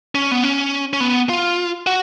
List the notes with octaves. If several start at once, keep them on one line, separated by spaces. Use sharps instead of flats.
C#4
B3
C#4
C#4
B3
F4
F#4